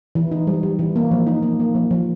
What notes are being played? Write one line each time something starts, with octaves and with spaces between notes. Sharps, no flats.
E3
D#4
G3
G3
E3
A#3
F3
D#4
A#3
A#3
F3
F3